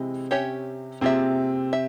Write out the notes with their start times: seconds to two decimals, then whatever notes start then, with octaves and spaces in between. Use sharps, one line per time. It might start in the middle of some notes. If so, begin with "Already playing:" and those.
Already playing: C3 E3 G#3 C4
0.31 C#4 G4 C#5 E5
1.01 C3 A#3 C4 F4 G#4 E5
1.73 E5